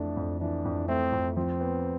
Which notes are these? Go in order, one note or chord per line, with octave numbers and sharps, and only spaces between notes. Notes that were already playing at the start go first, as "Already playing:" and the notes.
Already playing: F2 E3 A3 D4
F2
E3 D4
F2
A3 C4
F2
F3 C4
B3